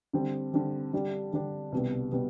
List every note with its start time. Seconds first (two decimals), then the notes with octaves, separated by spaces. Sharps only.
0.13 D3 G3 C4
0.53 D3 G3 C4
0.93 D3 G3 D4 G4
1.33 D3 G3 D4 G4
1.72 C2 B2 G3 B3
2.12 B2 G3 B3